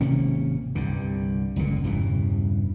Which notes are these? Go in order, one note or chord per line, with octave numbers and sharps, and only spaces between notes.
G#1 C3 A#3 C#4
C2 G2 D3
F#1 C#2 A#2 D3
E1 G2 C#3 E3